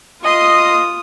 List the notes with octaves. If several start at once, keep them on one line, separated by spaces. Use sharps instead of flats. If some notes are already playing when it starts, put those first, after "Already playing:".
F4 D#5 C6 D#6